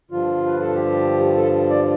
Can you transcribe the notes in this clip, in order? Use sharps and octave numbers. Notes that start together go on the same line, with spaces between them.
G2 D3 F3 F4
B4
A4
G4
A4
D5